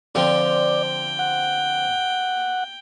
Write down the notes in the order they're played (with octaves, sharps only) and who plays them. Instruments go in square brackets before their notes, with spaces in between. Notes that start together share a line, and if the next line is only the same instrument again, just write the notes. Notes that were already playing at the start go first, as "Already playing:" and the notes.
[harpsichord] D3 F3 C4 [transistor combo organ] D5 [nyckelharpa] G5
[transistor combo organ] F#5